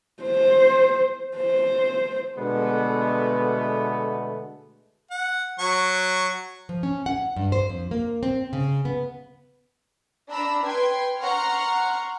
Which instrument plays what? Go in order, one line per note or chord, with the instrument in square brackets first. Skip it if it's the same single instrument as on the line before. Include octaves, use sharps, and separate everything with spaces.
[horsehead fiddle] C5
C5
[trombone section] B2 D3 G#3 A3 B3
[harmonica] F#5
F#3 C#6
[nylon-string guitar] F3
C#4
F#5
G2
C5
F2
A#3
C4
C#3
B3
[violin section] D4 A#5 B5 E6
B4 G5 C6 G#6
F#5 A#5 C6 C#6 F6